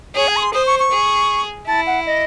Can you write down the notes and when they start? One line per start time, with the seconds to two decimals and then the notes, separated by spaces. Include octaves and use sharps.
0.16 G#4 C#5
0.28 G#5
0.37 C#6
0.42 C6
0.54 C5 D#6
0.66 C#6
0.79 C#6
0.92 G#4
1.67 E4 A5
1.87 F#5
2.06 D#5